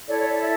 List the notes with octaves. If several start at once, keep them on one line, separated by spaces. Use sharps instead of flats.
E4 A4 C#5 D5
C#5
D5
E5